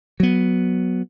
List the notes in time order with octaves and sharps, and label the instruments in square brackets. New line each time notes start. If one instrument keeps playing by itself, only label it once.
[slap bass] F#3 B3